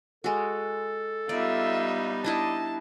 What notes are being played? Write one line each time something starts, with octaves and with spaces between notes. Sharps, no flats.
G#3 F#4 A4
G3 B3 D#4 F4 D5 E5
D4 E4 D#5 A5